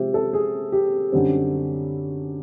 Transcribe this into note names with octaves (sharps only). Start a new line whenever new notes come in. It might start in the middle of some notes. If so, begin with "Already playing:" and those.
Already playing: C3 F3 G#3 C4 G4 C5 E5
A4
G#4
G4
F#2 D3 G3 C4